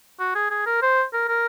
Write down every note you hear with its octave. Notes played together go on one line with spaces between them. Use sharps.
F#4
G#4
G#4
A#4
C5
A#4
A#4